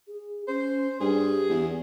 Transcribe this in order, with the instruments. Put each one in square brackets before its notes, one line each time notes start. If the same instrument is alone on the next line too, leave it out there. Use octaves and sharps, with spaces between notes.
[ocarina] G#4
[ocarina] C#4 [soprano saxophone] C5
[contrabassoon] G2 [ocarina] G4 [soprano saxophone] G#4
[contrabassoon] E2